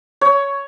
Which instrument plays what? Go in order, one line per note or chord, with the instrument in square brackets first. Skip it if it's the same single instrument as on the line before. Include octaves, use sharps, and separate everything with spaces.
[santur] C#5